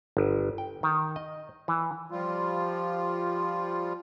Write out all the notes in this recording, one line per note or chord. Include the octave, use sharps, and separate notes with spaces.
G1
G5
D#3
D#5
E3
F3 G3 F4